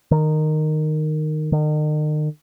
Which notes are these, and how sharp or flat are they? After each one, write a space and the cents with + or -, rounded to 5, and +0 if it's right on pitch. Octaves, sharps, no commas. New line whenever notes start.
D#3 -15
D#3 -40